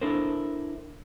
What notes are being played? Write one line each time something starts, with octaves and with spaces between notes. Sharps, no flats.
D4 E4 A4 A#4 C5